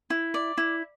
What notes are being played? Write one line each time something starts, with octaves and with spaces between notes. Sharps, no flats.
E4
D5
E4